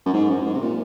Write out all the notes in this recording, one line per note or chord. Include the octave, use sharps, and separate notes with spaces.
F#2
G#2
F#2
F#2
G#2
C3
A#2